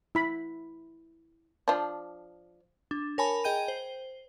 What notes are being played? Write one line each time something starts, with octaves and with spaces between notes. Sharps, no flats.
E4 B5
F3 D4
D4
A#4 C#5 G#5 A5 B5
G#4 D#5 G5 G6 D#7
C5